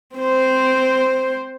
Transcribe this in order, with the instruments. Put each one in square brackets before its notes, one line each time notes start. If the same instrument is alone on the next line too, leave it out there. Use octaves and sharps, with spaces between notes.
[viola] C4 C5